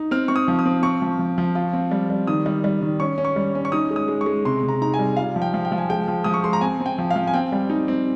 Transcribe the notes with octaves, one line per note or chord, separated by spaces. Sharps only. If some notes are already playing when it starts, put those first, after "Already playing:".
Already playing: D#4
C4 F6
C4 C#6
D#6
F3
D#6
C4
C4 C#6
F3
F3
F3
F4
C4
G3
G3
D#3 D#6
G3
G3
D#3
C#4 C#6
C#4
C#6
G3
C#4
C#6
D#4 D#6
G#3
D#6
G#3
C#6
G#3
C3 C6
C3
A#5
D#4 A#5
G#5
G3
F4 F5
F3
G5
F3
G5
F3
G#5
G#3 G5
F3
F3 D#6
C#6
G#3 C6
A#5
C4 G#5
C4
G5
F3
F5
F3
G#5
C4 G5
G3
D#4
C4